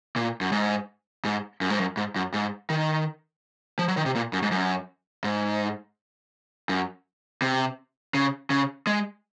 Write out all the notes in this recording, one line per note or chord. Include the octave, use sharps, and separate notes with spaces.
A#2
F#2
G#2
G#2
F#2
G#2
F#2
G#2
F#2
G#2
D#3
F3
F#3
D#3
C3
A#2
F#2
G#2
F#2
G#2
F#2
C3
C#3
C#3
G#3